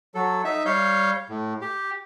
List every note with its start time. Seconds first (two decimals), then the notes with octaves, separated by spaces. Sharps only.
0.15 F#3 A4
0.44 D#4 E5
0.66 G3 C#5 F5 G6
1.29 A2
1.62 G4